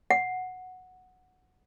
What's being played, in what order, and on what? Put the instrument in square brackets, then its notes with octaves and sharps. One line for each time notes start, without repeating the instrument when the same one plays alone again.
[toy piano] F#5